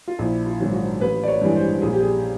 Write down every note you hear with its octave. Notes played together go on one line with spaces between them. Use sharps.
F4
A#1 E4
F4
G#2 D#3 F#3
F#4
A1 B4
D5
C#5
G2 E3 G#3
C5
A#1 G#4
G4
G#4